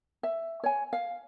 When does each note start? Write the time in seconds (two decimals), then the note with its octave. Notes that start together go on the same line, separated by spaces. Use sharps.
0.23 E5
0.63 C#5 G#5
0.93 F5